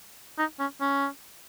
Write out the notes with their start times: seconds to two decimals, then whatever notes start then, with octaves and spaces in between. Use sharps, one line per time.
0.38 D#4
0.59 C#4
0.81 C#4